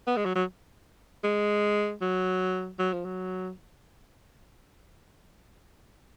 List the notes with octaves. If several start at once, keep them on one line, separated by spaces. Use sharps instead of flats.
B3
G#3
F#3
F#3
G#3
F#3
F#3
F3
F#3